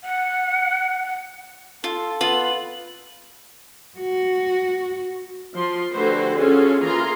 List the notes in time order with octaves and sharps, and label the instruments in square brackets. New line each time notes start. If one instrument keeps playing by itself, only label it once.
[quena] F#5
[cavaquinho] F4 [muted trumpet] A4
[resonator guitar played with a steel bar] B3 [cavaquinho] F4 [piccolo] F#7
[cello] F#4
[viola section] F3 C6
D3 A3 F#4 G4 B4 C5
C#4 F4 F#4 G#4 A4
E3 A#3 F4 G#4 A#5 C6